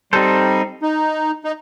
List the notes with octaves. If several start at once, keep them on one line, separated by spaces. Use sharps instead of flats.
G3 C4 D#4 A4 C5
D#4
D#4